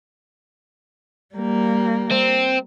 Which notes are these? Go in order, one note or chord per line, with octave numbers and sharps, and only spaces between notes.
G3 A#3
C4